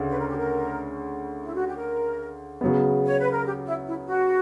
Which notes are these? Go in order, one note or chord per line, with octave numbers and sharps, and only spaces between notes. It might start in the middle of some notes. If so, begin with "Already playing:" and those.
Already playing: D2 C#3
B4
A#4
G4
A#4
E4
F#4
G4
A#4
C#3 F#3 B3
C#5
B4
A#4
G4
E4
E4
F#4